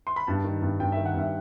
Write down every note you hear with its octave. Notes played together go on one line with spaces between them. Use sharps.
C6
B5
G2 A5
D#3
G2
G2 G5
D#3 E5
F#5
G2 E5